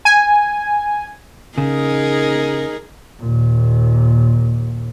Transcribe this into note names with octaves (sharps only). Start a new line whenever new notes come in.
G#5
C#3 D#4 G#4 A#4
D#2 A#2